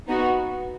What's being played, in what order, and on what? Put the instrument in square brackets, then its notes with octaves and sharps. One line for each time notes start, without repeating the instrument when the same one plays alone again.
[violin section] B3 D#4 F#4